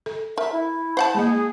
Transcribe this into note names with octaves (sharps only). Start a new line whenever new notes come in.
A4
A#4 E5
E4
C5 F#5 A5
G#3 A#3 G#4 D#5